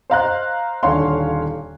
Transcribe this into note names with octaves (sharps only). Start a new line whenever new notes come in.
C5 D#5 F5 A#5 C6 F#6
D#1 D3 C#5 F5 C6